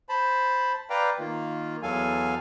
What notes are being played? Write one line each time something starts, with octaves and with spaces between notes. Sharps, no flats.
C5 A5 B5
B4 D5 F5 G5 A#5
D#3 A#3 F4
E2 F#3 A4 F5 G#5